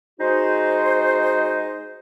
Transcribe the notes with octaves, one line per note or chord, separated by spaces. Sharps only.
G#3 D#4 F#4 C5